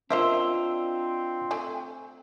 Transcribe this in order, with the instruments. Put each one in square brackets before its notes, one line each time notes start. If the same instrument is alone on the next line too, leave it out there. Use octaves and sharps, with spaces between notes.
[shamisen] A#3 C5 E5 [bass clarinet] C4 [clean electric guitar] D4 F4 [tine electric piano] D#5 E6
[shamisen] A3 G5 G#5